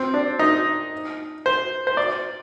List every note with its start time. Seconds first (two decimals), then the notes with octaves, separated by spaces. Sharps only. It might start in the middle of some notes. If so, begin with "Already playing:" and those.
Already playing: C4
0.14 D4
0.39 D#4
1.46 C5
1.87 C5
1.97 D5